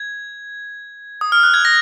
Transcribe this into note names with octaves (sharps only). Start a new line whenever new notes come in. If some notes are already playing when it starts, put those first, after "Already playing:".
Already playing: G#6
D#6
F6
F#6
G#6
A#6